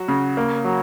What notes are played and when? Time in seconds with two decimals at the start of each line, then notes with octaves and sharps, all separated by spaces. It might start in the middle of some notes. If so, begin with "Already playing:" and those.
Already playing: F#3 F#4
0.08 C#3
0.37 A#3
0.64 F#3